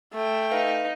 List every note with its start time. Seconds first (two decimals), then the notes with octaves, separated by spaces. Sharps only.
0.13 A3 G5
0.52 D#4 B4 F5